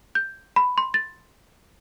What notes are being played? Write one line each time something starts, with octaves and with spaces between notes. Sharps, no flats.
G6
B5
C6
A6